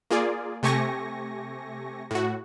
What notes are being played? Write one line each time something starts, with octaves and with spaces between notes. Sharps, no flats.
A#3 F4 G#4 D5
C3 A3 G4 G#5 C#6 A#6
A2 F#4